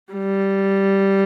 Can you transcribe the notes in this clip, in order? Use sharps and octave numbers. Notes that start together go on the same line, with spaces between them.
G3